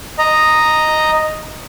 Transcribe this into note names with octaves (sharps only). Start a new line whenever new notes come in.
D#5 A#5